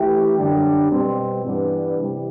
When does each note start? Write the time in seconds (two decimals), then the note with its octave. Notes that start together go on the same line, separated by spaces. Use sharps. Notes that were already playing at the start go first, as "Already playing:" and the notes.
Already playing: E3 A3 E4 G4
0.37 F#2 D3 G3 D4 G4
0.90 B2 G3 C4
1.43 G2 E3 G3 B3 D4
1.97 C3 E3 G3